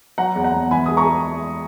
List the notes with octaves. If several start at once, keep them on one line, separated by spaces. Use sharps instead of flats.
F#3 F#5 A#5
E2
F#5 A#5
E2
E3 G#5 B5
G#3 D#6
A#5 C#6
G#3